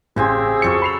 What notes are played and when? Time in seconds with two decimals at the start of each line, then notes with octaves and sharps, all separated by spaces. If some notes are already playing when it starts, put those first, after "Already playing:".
0.16 A1 C#3 C4 G4 G#4 G#5 C6 E6
0.62 F2 F#3 A4 C#6 C#7
0.82 B5 E6 C7 F7